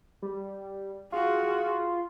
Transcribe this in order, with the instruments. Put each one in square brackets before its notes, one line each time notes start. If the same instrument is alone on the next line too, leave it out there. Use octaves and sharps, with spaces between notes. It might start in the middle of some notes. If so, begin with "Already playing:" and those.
[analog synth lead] G3
[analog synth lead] F4 [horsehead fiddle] F#4 G#4